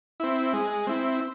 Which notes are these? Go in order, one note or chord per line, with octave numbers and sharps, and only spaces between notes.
C4 E4
G#3
C4 E4